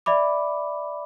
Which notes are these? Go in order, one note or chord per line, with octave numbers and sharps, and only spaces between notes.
D5 E5 B5 D6